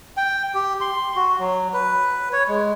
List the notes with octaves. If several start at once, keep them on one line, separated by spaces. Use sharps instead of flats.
G5
G4
C6
F#4
F#3
B4
C#5
G#3